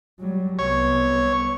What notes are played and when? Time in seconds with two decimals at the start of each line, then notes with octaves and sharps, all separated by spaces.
0.20 F#3 G3
0.59 C2 B3 C#5